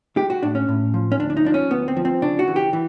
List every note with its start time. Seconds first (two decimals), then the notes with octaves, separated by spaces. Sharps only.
0.17 G#3 G4
0.30 F#4
0.43 A2 D4
0.55 C#4
0.69 A2
0.94 F3
1.12 C#4
1.19 D2 D4
1.30 D4
1.37 D#4
1.45 F3 D4
1.54 C#4
1.70 D2 B3
1.88 C4
1.97 F3
2.05 C4
2.22 C#3 D4
2.39 F#4
2.47 E3
2.56 G4
2.73 E3